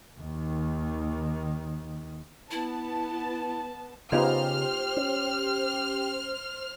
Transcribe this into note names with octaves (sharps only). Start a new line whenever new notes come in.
D#2 D#3
B3 E4 A5
C#3 B3 D#4 F4 G4 C5 F6
C#4